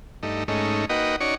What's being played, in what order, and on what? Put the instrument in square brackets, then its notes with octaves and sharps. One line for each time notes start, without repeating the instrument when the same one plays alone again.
[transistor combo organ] G2 A3 D#4
G#2 A3 C#4 D#4
A#3 D#4 F#4 B4 D#5 G5
C#4 D#4 F#4 C#5 D5